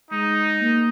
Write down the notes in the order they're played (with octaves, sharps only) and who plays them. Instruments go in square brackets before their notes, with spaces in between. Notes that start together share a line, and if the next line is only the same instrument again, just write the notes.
[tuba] G#3 [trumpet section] D#4
[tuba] A#3